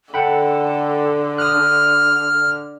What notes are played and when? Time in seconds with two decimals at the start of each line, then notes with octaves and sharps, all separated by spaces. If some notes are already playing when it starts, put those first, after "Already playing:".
0.14 D3 A4 F#5 G5 B5
1.38 D#6 F6 F#6